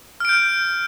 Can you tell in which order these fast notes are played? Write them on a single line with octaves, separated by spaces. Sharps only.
F6 D7 G6